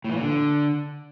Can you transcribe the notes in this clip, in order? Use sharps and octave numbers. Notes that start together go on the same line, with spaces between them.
A2
E3
A#2
D3